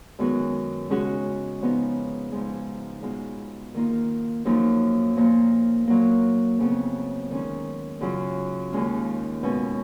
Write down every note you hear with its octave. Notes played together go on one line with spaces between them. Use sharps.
F#2 D#3 G#3 B3 F#4
C#3 G#3 C#4 F#4
C#3 F3 B3 D#4
G#2 F3 G#3
B2 G#3 B3 F4
D#3 A#3 F4
F#2 F3 A#3 D#4
A#2 F3 A#3 F4
A#2 F#3 A#3
F2 C#3 F#3 B3
D#3 G#3 C#4
F#2 C#3 F#3 C#4 F4
D#2 D#3 G#3 C#4 F4
B2 G#3 C#4